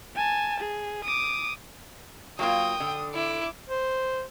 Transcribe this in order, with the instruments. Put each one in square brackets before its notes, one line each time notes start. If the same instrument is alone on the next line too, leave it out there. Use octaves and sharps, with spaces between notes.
[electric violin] G#5 A5
G#4
D6 D#6
[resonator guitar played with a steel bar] F#3 A#3 F4 [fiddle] G5 [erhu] D#6
[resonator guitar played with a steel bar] D3
[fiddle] E4 [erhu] D6
[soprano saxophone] C5